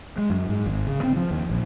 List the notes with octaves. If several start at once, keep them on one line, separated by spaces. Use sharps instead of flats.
G#3
F#2
G#2
G#1
C#3
C4
F3
D#2
A#1